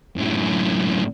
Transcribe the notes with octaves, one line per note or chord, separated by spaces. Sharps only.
F#2 A2